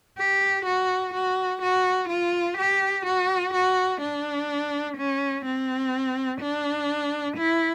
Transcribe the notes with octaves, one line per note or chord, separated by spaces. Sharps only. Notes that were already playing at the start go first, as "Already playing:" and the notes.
G4
F#4
F#4
F#4
F4
G4
F#4
F#4
D4
C#4
C4
D4
E4